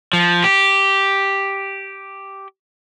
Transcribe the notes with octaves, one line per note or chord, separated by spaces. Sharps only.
F3
G4